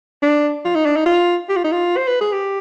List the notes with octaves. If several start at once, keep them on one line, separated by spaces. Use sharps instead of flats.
D4
F4
D#4
D4
D#4
F4
G4
F4
D#4
F4
C5
B4
G#4
G4